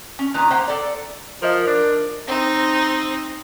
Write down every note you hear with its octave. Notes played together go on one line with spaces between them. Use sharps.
C#4
A#2 D#3 B4 G#5 A#5
A#3 C5 E5 F#5 G5
A4 D5
F3 A#4 D#5
D4
C4 D#4